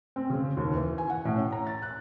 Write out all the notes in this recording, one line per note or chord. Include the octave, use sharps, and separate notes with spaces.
C4
C#3
D#2
E3
G#5
F#5
A2
C#4
A#5
A6
F#6